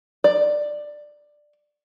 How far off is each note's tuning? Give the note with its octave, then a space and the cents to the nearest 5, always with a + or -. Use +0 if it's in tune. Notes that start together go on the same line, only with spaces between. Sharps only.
D5 +10